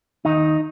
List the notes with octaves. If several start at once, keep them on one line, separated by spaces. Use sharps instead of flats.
D#2 D#3 D#4